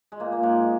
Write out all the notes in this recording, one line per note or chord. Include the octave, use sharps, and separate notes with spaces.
G#3
A#2 A#3
A#3
G#2 G#3